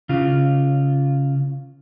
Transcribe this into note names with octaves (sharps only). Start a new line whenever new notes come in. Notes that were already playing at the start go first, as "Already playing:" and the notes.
C#3 F4